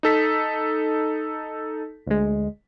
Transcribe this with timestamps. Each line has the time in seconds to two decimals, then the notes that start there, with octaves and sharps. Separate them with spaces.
0.03 D#4 A4 B6
2.07 D2 G#3